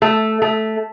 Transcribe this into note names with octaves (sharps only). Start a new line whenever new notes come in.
A3
A3